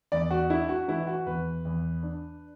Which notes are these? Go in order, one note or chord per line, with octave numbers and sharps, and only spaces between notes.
E2 D5
F#4
D4 E4
F#4
E3 E4
F#4
E2 B4
E2
D4